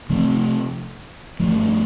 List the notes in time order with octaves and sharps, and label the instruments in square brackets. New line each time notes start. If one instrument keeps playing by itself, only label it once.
[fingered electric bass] C3 F3 A3 C4
G2 F3 A3